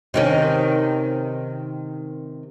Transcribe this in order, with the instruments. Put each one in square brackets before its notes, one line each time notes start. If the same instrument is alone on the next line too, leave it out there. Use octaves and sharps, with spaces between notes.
[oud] C3 D#3 C#4